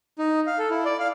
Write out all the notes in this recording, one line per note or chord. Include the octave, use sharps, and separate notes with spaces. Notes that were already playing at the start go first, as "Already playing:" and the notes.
D#4
F5
A4
E4
D5
F5